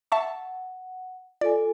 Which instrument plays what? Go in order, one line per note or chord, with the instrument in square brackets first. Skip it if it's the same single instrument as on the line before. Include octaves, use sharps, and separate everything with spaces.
[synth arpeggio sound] E5 A5 C#6 [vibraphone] F#5
[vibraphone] F4 A4 G#5 [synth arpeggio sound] D5